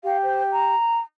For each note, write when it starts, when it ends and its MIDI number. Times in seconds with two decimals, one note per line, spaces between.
0.04 0.75 67
0.04 0.17 77
0.23 0.43 72
0.52 0.99 82